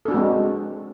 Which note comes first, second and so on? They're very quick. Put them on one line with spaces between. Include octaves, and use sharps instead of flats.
A4 D4 F#4 G#3 C4